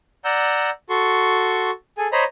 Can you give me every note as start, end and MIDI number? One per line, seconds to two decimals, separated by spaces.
0.25 0.70 74
0.25 0.70 78
0.25 0.70 82
0.25 0.70 88
0.25 0.70 91
0.90 1.71 66
0.90 1.71 69
0.90 1.71 84
0.90 1.71 85
1.98 2.07 68
1.98 2.07 69
1.98 2.07 80
2.12 2.24 72
2.12 2.24 73
2.12 2.24 75
2.12 2.24 82
2.12 2.24 83